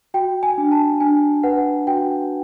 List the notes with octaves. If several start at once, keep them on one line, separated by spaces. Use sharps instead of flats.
F#4 G5
G#5
D4
A5
D4 G#5
B4 F#5
F#4 G5